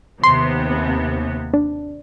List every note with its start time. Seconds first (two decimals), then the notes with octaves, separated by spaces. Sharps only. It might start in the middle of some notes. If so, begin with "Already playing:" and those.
0.23 D#2 C3 B3 C6
1.54 D4